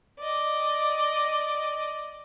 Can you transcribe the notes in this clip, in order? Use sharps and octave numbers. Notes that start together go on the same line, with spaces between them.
D5 D#5